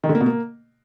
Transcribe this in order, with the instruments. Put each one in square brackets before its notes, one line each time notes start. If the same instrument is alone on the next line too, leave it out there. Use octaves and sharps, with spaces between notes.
[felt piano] D#3
D3
A#3
B2
A#3